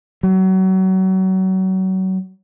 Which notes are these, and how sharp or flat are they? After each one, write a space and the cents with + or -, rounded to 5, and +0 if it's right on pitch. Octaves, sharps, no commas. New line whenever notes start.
F#3 +30